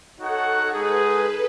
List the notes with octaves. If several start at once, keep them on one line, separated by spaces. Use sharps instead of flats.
D#4 F#4 A4 C#5 F#5
G#3 D#4 G#4 B4